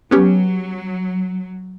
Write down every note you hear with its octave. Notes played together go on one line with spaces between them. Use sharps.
F#3 B3 C#4 G4